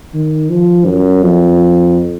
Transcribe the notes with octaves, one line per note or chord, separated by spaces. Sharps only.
D#3
F3
F#2
F2